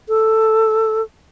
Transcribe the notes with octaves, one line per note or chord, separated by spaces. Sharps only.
A4